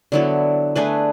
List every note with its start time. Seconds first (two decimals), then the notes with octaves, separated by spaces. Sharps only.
0.12 D3 F#3 B3 E4
0.75 A3 D4 G#4 B4